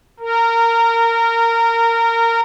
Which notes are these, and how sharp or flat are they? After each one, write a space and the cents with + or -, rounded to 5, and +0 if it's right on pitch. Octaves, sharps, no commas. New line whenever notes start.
A#4 -20